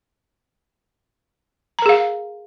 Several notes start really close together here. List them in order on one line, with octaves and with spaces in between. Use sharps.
A#5 A#4 G#4 F5